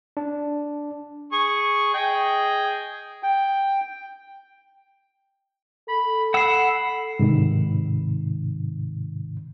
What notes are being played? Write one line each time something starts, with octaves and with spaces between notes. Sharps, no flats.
D4
G#4 C#6
G#4 D#5 G5
G5
A4 B5
F#5 B5 E6 C7 E7
G#2 C3 D#3